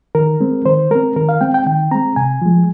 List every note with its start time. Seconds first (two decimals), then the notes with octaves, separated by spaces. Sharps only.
0.15 D#3 A#4
0.41 G#3 C4
0.66 D#3 C5
0.90 G#3 C4 A#4
1.16 D#3 A#4
1.29 F5
1.41 G#3 C4 G5
1.54 G5
1.67 D#3 G5
1.91 G#3 C4 A#5
2.16 C3 G#5
2.42 F3 G#3